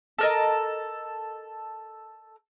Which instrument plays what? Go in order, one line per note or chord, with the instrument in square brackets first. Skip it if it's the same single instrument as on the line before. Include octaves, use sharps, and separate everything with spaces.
[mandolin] A4 A#4 D#5